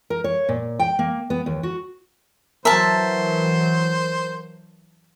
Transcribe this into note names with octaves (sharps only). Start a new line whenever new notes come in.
A#4
C#5
A#2
G5
A#3
B3
D#2
F#4
E3 F#3 A#4 C5 E5 A5